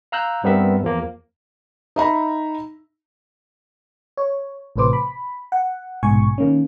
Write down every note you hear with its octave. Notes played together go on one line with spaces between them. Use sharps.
F5 A#5 E6 F#6 G6
G2 G3 B3 C4 A#4 E5
E2 F3 A#3
D#4 E5 A#5 B5
C#5
A1 A2 C3 B4 C5 D6
B5
F#5
A#1 G#2 B2 G#5 C#6
D#3 A#3 C#4